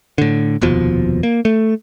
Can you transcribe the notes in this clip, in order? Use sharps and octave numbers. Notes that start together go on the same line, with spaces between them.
A2 D3
F1 D#2 B2 F3
A#3
A3